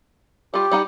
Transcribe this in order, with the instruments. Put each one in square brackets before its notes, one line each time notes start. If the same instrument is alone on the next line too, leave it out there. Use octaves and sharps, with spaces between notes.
[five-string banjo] G3 F4 [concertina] G4
[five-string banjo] G3 D#4 F#5